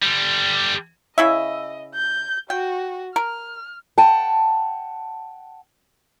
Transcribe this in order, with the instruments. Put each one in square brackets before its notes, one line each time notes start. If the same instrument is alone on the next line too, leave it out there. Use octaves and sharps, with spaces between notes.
[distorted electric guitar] D3 G3
[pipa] C#3 E4 E5 [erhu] D#5
[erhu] G6
[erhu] F#4 [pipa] G5
[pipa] A#4 [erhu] F6
[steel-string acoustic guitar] F#5 G5 A5